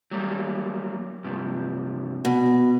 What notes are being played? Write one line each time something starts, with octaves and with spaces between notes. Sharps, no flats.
F#3 G3 A#3
G2 C3 F3
B2